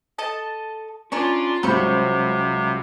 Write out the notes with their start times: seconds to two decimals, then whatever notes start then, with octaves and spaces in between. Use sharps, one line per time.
0.18 A4 D#5 A5
1.12 C#4 D4 F4 G#4 A#4 C#5
1.63 C#2 C3 F#3 G3 C5 B5 C#6